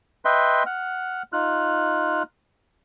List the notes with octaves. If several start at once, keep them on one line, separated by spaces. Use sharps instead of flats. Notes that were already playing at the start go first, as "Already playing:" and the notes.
B4 D#5 E5 G5 C6
F#5 F6
D#4 F4 F6 F#6